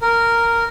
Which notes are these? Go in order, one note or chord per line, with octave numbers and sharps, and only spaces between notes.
A#4